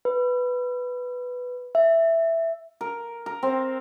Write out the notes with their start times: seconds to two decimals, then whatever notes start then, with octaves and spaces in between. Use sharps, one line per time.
0.05 B4
1.75 E5
2.81 A#4
3.26 A#4
3.43 C4